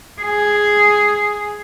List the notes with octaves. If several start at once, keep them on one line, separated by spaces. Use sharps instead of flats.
G#4